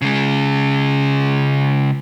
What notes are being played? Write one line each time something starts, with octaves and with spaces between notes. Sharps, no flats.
C#3 G#3